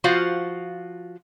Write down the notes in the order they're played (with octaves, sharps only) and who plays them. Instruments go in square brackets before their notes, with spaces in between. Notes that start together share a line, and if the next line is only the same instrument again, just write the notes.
[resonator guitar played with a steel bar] F3 F4 F#4 C5 F5